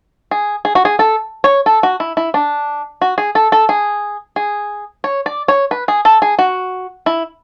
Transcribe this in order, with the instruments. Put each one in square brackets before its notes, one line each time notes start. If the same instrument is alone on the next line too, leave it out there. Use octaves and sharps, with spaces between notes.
[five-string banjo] G#4
G#4
F#4
G#4
A4
C#5
A4
F#4
E4
E4
D4
F#4
G#4
A4
A4
G#4
G#4
C#5
D5
C#5
B4
G#4
A4
G#4
F#4
E4